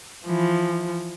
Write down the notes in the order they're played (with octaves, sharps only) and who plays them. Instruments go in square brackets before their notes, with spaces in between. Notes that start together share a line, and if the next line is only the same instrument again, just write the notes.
[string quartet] E3 F3